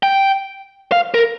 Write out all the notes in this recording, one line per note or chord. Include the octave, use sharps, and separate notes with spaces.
G5
F5
A#4